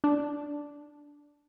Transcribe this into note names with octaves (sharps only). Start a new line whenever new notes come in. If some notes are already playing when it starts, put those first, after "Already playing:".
D4